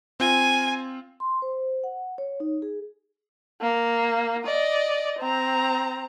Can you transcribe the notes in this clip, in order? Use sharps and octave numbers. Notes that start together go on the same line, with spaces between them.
C4 F4 G#5
C6
C5
F#5
C#5
D#4
G#4
A#3
D5 D#5
C4 A#5